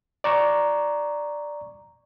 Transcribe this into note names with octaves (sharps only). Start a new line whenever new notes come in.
D5 A#5 C#6